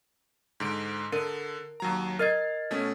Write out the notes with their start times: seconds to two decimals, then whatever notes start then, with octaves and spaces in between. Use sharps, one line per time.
0.60 G#2 D3 D7
1.12 D3 A#4
1.80 D#2 F#3 A#5
2.19 A#4 D#5 F6 G#6 A6 C7
2.71 B2 A3 C#4